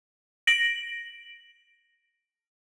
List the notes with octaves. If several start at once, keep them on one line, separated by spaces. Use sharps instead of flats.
A#6 D7 F#7